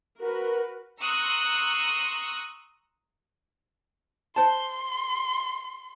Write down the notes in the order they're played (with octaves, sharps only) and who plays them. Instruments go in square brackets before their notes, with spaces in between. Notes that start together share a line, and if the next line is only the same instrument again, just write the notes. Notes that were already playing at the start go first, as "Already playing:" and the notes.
[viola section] F#4 A#4 B4
[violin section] A#5 C6 C#6 D#6 E6 F#6
[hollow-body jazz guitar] C5 A5 [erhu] C6